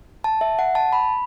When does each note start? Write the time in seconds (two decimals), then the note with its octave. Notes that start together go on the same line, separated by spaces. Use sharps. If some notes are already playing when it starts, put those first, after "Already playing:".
0.24 A5
0.41 E5
0.59 F#5
0.75 A5
0.93 B5